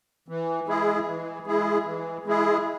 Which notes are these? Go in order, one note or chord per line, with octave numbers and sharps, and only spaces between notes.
E3
G#3 E4 G#4
E3
G#3 E4 G#4
E3
G#3 E4 G#4